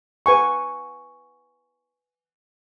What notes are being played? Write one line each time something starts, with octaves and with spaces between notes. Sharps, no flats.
B4 G#5 C#6